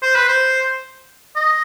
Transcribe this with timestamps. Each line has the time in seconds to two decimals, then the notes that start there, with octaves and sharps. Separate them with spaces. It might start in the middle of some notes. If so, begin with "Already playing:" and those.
0.02 C5
0.16 B4
0.28 C5
1.36 D#5